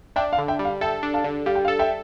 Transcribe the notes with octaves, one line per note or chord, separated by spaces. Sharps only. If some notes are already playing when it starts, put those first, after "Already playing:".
D4 E5 G5
F5
D3
E5 G5
G3
F5
A4 E5 G5
D4
F5 A5
D3
G3 F5
G5
F5
A4
E5 G5